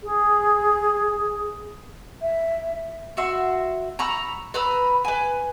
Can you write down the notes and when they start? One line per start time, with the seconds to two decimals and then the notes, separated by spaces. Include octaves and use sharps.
0.04 G#4
2.22 E5
3.17 F#4 E5 C6
3.99 A#5 B5 C#6 E6
4.54 B4 A#5 B5 E6
5.05 B4 G#5